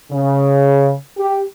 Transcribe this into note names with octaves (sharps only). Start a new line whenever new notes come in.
C#3
G4